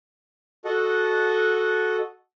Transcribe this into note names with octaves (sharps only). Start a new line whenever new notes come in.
F#4 A4 D#5 F#5